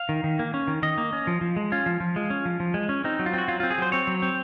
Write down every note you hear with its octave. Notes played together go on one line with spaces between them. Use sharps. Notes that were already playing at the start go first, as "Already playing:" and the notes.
Already playing: F5
D#3
D#3
A#3
C#4
D#3
D#3 D#5
A#3
C#4
F3
F3
G#3
C#4 F4
F3
F3
G#3
C#4
F3
F3
G#3
C#4
C4 D#4
F#3
F4
C4 F#4
F#3 F4
C4 F4
G#4
F#3 C5
C4 C#5
F#3
C4